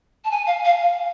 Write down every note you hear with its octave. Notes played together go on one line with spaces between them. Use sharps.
A5
G#5
F5
F5